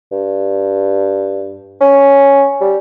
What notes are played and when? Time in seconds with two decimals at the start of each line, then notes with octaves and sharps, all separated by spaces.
0.11 G2
1.81 C#4
2.61 G3